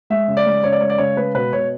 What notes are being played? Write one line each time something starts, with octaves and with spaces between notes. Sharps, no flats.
G#3 E5
C#3
D5
G#3
C#3 C#5
D5
G#3 C#5
D5
C#3 C#5
G#3 B4
B2 B4
B2 C#5